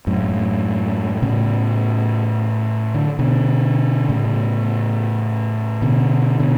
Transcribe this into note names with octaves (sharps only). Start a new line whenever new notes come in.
F#2 A2
A2 C#3
D3
B2 D3
A2 C#3
B2 D3
B2 D3